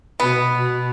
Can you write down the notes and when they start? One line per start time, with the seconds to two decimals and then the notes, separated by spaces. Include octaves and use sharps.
0.20 B2 B3
0.56 B2